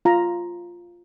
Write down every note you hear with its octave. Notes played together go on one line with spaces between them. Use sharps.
F4 A#5